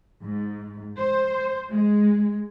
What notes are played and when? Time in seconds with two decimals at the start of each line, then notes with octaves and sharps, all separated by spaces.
0.22 G#2
0.97 C5
1.70 G#3